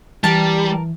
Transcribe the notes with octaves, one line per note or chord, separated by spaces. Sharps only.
E3 G3 A#4 A5